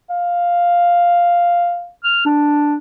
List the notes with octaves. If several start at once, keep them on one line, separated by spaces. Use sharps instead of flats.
F5
F6
D4